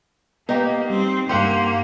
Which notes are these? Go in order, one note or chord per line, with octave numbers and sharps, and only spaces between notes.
A#3 B3 D#4 G4
G3 C4
G2 A#3 G4 F#5 G5 C6